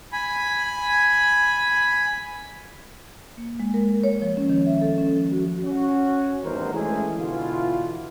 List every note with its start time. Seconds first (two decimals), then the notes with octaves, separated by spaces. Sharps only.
0.12 G#5 B5
3.37 A#3
3.60 G#3
3.74 A#4
4.04 C#5
4.22 F3
4.37 C#4
4.49 D#3
4.67 E5
4.81 A4
4.98 C#4
5.16 F3
5.32 F#4
5.64 C#4 F#4
6.43 E2 G2 D#3 A3 A#4 C5
6.74 E3 G#3 A3 C#4 E4 G#4
7.17 B2 D3 E3 E4 F4